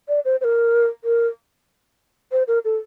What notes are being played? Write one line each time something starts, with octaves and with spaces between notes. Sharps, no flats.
D5
C5
C5
A#4
A#4
C5
A#4
A4